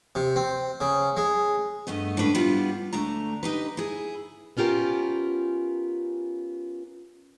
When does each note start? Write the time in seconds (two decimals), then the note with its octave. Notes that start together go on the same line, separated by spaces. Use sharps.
0.15 C3
0.36 C4
0.81 C#3
1.17 G#3
1.87 G2 A3 B3 D#5
2.17 A2 C#3 D4 B4
2.35 G3 B3 D4 E4 F4
2.93 D2 A3 D4 A#5
3.43 D#4 G4 B4
3.77 E4 G#4
4.57 B3 C#4 F4 G4 A#4